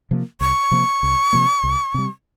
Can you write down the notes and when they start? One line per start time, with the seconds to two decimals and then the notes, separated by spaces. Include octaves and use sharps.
0.11 C3 F3 A#3
0.41 C2 C#6
0.71 C3 F3 A#3
1.03 C2
1.33 C3 F3 A#3
1.63 C2
1.94 C3 G3